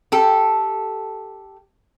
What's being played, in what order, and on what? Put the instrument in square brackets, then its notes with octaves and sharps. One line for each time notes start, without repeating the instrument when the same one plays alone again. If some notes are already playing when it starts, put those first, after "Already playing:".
[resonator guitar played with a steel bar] G4 A4